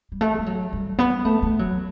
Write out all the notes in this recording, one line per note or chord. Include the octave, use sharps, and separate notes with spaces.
G3
A3
G3
F#3
G3
B3
A3
A3
F#3